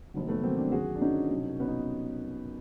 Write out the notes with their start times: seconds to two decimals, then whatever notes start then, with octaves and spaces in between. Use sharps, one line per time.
0.14 F1 D#2 D#3 F#3
0.28 A3 B3
0.42 F1 D#2 D#3 F#3 A#3 C4
0.57 C4 D4
0.72 G#1 F#2 D3 F#3 F#4 G#4
0.95 D4
1.01 G#1 F#2 D3 F#3 C#4 D#4
1.30 C2 B2 F#3
1.59 C2 B2 F#3 B3 C#4
1.68 D#4